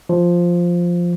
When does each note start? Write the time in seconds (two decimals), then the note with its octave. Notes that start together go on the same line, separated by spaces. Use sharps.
0.09 F3